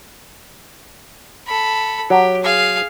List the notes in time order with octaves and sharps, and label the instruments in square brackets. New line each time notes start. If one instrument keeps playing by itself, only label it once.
[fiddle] A4 B5
[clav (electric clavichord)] F#3 [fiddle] G4
[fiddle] G#4 F5